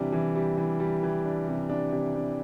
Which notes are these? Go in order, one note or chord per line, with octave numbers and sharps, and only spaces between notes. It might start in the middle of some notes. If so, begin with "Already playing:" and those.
Already playing: C3 E3 G3 D4
E3
G3
E3
G3
E3
D4
C3
D4
C3
D4